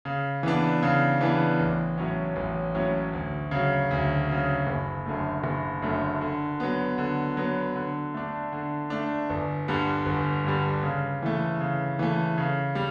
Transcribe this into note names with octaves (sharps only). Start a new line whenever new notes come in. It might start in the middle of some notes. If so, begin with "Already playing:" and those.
C#3
E3 B3 D4
C#3
E3 B3 D4
A1
A2 F#3 C#4
A1
A2 F#3 C#4
D2
C#3 F#3
D2
C#3 F#3
F#1
F#2 D3 A3
F#1
F#2 D3 A3
D3
F#3 B3
D3
F#3 B3
D3
A3 D4
D3
A3 D4
G1
G2 D3 G3
G1
G2 D3 G3
C#3
E3 A3
C#3
E3 A3
C#3
G3